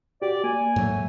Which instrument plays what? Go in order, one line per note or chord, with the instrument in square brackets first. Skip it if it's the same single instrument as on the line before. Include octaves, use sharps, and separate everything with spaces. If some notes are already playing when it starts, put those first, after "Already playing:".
[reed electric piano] F#4 G4 [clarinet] D5
[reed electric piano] A#3 [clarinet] G#5
[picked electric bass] G#2 F#3 A3